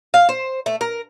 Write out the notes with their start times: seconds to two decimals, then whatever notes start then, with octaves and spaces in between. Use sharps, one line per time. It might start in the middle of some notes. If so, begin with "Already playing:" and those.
0.14 F5
0.29 C5
0.66 A3
0.81 A#4